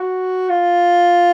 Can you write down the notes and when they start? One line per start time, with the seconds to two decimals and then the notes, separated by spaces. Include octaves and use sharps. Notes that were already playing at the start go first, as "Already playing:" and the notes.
Already playing: F#4
0.49 F4